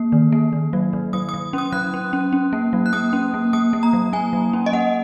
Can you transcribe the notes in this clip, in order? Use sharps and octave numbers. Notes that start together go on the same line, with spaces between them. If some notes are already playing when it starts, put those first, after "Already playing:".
Already playing: A#3
D#3
A#3
D#3
F#3
D#3
F#3 D#6
F#3 D#6
C#4 D#6
F#3 F#6
C#4
C#4
C#4
A#3
F#3
F#6
A#3 D#6
C#4
A#3
A#3 D#6
A#3
A#5
F#3
A#3 G#5
F#3
C#4
D#5
A#3 F#5